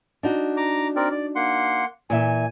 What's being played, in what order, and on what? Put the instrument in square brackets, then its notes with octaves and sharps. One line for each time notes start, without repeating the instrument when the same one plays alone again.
[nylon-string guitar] D4 D#4 F#4
[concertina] A#5 D6
C4 A#4 D5
D5
A#3 F#5 C6
[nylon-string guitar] A#2 E3 E5 [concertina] G#5